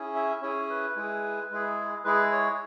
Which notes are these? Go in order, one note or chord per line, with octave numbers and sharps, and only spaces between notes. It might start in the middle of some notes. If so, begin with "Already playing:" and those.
Already playing: C#4 E4 G#4
E5
C#4 E4 G#4 C#5
B4
G#3 E4 G#4
G#3 E4 G#4
G#3 E4 G#4 B4
C#5